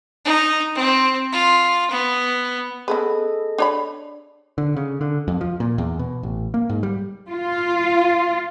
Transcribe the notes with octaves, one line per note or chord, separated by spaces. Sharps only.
D#4
C4
F4
B3
B3 C#4 G#4 A4 B4 D#5
D4 C#5 B5
D3
C#3
D3
F2
F3
A#2
E2
B2
A1
A#3
G#2
G3
F4